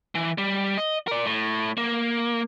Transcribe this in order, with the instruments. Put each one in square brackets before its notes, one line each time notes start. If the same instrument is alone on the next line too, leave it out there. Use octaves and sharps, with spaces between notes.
[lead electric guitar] E3
G3
D#5
A#4 D5
A2
A#3